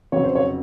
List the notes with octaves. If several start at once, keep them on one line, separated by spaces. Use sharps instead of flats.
F1 F2 C#3 F#3 C#5
C5
C#5